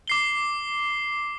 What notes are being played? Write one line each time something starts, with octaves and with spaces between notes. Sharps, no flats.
D6 C7 G7